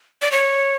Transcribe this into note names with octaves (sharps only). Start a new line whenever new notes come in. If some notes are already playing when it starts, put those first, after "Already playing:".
D5
C#5